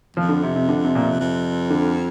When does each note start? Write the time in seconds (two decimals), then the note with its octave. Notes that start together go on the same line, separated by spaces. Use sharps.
0.16 F2 F3
0.29 D3
0.43 C3
0.55 C3
0.69 D3
0.85 C3
0.95 A#2
1.02 C3
1.20 F2
1.70 D3